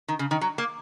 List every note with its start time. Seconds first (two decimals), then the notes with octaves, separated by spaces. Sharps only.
0.08 D#3
0.19 C#3
0.31 D#3
0.41 F#3
0.58 A#3